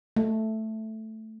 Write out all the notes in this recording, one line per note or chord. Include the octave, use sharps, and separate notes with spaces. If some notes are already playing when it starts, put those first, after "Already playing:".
A3